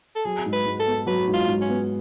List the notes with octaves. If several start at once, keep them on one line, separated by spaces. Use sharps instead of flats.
A4
F#3 G#4
G#2
B4
G#2
A4
B3
F#3 B4
G#2
F4
G#2
C#4
B3